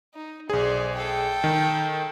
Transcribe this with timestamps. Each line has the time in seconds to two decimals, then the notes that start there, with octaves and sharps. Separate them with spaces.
0.14 D#4
0.50 B1 G#4 C5 D5
0.96 A4 G5
1.44 D#3